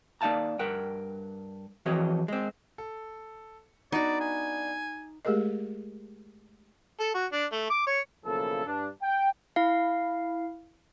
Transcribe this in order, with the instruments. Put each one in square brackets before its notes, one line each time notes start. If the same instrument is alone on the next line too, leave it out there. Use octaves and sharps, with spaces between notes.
[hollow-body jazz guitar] A#3 D#4 D5 F5 A5 A#5
G2 A#4 F#5 G5
F2 E3 F#4 G#4 C#5 D#5
G#3 C4
[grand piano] A4
[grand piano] B3 D4 [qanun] D#4 F#4 [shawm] D5
[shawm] G#5
[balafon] G#3 A3 G4 G#4 A#4 D#5
[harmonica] A4
F#4
D4
A3
D6
C#5
[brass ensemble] B1 C#3 F3 A#3 E4 A4
G2 D4
G5
[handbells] E4 F5